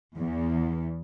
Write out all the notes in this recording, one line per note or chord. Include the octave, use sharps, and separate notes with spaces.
E2